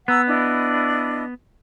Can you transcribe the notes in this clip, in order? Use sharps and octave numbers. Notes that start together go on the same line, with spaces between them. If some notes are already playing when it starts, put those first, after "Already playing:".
B3 F#5 A#5 E6
D4 E4 D#5